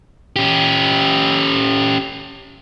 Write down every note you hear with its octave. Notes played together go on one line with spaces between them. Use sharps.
C#4 G4